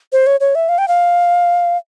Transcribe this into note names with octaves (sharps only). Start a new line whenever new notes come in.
C5
C#5
C#5
E5
F5
G5
F5